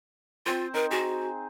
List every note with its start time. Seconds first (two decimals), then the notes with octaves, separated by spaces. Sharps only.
0.46 C4 F4 C5
0.74 D#4 A#4
0.91 F#4 G#4